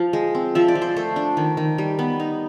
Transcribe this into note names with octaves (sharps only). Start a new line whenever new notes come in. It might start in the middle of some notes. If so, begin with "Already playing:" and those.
Already playing: F3 F5
G#3
C4
F3 E5
D5
F3
C5
A3 C5
D4
D#3
D#3
G3
B3
D#4